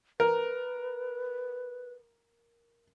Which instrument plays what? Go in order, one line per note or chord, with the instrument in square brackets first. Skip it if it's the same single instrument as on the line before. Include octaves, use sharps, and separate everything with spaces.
[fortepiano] A#4 [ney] B4